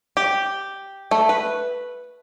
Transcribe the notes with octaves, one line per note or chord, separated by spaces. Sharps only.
G4
A3
B4